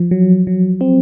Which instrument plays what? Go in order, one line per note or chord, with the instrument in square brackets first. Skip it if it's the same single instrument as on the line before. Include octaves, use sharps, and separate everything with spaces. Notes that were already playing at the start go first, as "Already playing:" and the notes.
Already playing: [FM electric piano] F3
F#3
F#3
C4